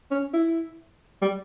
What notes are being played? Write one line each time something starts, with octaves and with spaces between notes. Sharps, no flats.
C#4
E4
G3